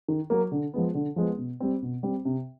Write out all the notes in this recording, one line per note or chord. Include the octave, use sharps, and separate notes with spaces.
D#3
F#3 A#3
D3
F3 G#3 B3
D3
F3 G#3 B3
B2
G3 C4
B2
G3 C4
C3